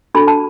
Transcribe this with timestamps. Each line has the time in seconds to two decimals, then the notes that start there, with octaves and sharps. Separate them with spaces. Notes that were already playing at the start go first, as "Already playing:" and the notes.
0.14 D4 F#4 A4 B5
0.28 A5